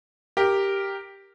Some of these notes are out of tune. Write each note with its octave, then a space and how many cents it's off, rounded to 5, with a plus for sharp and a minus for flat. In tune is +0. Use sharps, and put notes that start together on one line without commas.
G4 +0 A#4 +0